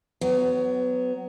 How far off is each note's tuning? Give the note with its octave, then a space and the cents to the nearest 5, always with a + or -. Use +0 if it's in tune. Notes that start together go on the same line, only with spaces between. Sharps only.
F#3 +10 B3 +30